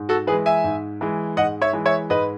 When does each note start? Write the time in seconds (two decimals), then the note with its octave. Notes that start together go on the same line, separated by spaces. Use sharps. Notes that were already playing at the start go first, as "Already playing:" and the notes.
Already playing: G#2
0.09 F#4 A4
0.27 E3 G#4 B4
0.32 G#3
0.46 E5 G#5
0.64 G#2
1.01 E3 G#3
1.37 G#2 D#5 F#5
1.62 C#5 E5
1.73 E3 G#3
1.86 C#5 E5
2.10 G#2 B4 D#5